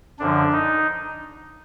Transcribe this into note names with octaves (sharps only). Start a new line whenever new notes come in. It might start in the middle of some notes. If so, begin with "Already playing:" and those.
F#2 D3 F3 D4
D#4